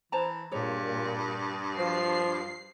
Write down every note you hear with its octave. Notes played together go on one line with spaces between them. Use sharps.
E3 C5 A5 A#5
G2 A#2 G#4 C#5
F3 F#4 B4 C5 C7